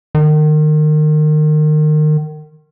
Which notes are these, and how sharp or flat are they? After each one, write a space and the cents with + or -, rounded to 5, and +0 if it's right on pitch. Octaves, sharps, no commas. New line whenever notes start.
D#3 -30